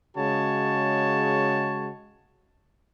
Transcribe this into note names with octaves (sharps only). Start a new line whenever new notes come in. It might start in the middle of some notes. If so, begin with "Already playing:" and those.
C#3 G#3 F#4 C#5 A5